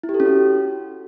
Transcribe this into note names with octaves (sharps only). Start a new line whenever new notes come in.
E4
G4
A4
C#4
F#4